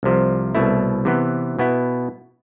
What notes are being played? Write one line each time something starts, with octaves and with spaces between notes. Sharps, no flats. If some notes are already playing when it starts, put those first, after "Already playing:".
C2 C3 F3
C2 B2 A3 E4
C3 E3 B3
B2 B3 E4